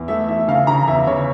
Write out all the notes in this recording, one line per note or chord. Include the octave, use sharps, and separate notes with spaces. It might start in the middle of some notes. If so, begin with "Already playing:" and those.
Already playing: E2
A3 E5
E3 E5
C#3 F5
C#3 A#5
E2 E5
C#3 C#5